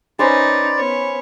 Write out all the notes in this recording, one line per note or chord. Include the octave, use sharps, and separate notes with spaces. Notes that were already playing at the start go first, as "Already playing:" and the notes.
C#4 D#4 B4 C5 D5
B3 C#5